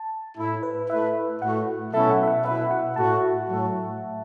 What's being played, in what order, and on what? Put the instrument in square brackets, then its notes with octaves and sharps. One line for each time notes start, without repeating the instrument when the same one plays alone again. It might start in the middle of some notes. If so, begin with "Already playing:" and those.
Already playing: [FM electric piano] A5
[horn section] A2 A3 E4
[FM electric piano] B4
[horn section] A3 E4 B4 [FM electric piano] E5
[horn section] A2 A3 F#4 [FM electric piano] F#5
[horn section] B2 F#3 C#4 E4 A4 [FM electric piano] E5
[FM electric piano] F#5
E5
F#5
[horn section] B2 B3 E4 B4 [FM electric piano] E5
[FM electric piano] F#5
[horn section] A2 A3 F#4 [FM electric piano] A5
[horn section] A2 F#3 A3 F#4 A4